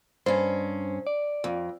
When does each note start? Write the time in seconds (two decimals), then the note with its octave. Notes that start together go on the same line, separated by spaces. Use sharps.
0.26 G2 C#4 C5
1.07 D5
1.44 F2